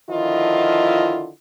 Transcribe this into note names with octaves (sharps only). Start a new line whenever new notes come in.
D3 D#3 F3 E4 F4 D#5